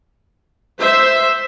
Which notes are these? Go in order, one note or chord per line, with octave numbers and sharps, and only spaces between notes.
C5 E5